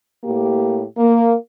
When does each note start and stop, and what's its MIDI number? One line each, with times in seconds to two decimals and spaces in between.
0.24 0.83 45
0.24 0.83 58
0.24 0.83 67
0.98 1.35 58